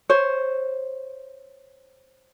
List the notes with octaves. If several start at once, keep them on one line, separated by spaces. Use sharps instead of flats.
C5 C#5